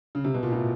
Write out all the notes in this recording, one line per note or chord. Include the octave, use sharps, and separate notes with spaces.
C#3
C3
B2
A#2
A2